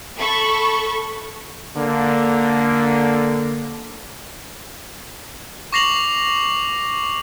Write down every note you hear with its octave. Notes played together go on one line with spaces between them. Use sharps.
A4 B5 C#6
D3 A#3
C#6 D6 A#6 C7 F7 F#7